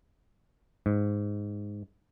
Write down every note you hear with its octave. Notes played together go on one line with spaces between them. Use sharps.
G#2